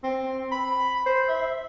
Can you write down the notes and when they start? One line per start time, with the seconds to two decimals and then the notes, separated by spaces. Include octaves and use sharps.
0.03 C4
0.52 B5
1.06 C5
1.29 E5